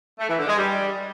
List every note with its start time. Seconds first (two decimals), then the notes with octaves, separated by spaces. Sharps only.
0.20 A3
0.29 E3
0.38 D3
0.48 G#3
0.57 G3